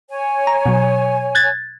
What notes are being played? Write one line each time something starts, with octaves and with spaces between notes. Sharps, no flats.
C#5 G#5
A#5
B2 F#3
F#6 G#6 A6